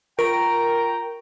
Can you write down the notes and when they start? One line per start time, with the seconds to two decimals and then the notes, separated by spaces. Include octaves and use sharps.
0.19 F4 A#4 G5 A#5 C#6 D7